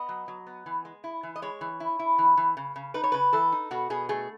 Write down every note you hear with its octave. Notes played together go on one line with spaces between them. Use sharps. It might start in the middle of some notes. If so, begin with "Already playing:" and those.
Already playing: B3 D#5
F#3
F#3
B3
E3
G#3
E4
E3
D#5
G#3 C#5
E3
E4
E4
E3
E3
C#3
C#3
D#4 B4
C#5
C#3 B4
E3 A4
D#4
B2 F#4
B2 G#4
A3 G#4